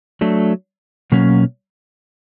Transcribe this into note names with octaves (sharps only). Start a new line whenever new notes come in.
F#3 A3 D4
B2 F#3 A#3 C#4